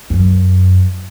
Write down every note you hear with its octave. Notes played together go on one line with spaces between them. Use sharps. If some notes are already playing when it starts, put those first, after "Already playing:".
F#2